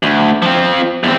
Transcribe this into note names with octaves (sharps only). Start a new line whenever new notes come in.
D2
F3 C4
E2 C4